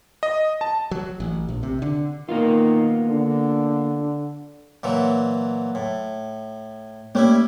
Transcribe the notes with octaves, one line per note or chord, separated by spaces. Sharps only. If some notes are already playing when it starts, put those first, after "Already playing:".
D#5
A5
F#3
A1
A#1
C3
D3
D#3 A#3 B3 F4
D3
A#2 E3 F#3
A2
G3 A3 A#3 C#4 E4 C#5